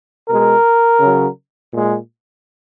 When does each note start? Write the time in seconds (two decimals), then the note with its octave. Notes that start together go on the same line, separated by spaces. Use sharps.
0.29 B2 G#3 A#4
1.00 C#3 F#3
1.72 A#2 G#3